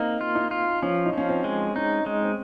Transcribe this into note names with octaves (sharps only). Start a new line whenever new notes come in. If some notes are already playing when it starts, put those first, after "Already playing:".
Already playing: A#3 C4 D#4
F4
D#4
F4
F3 C#4
D#4
F3 C#4
C4
G#3
C#4 D#4
G#3
C4